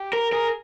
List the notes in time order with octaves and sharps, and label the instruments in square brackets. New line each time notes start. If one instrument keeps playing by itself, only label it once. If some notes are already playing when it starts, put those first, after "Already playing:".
Already playing: [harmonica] G4
[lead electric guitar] A#4
[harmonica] G#4 [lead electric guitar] A#4